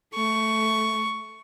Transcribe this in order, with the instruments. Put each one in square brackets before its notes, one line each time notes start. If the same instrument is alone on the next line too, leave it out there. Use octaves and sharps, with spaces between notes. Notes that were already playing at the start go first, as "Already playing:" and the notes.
[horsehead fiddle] A3 [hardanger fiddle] C#6